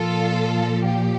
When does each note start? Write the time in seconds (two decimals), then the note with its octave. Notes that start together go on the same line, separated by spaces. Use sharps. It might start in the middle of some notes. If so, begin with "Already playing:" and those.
Already playing: A#2 F3 F4 A4
0.85 G4